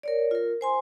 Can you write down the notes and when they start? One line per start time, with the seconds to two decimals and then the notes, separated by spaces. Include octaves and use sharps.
0.03 A#4 C#5 D5
0.31 F4 A#4
0.61 C5 G#5 C6